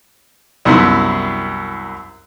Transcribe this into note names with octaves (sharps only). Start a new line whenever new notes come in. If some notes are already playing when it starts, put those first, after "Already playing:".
C2 F#2 B3 E4 C6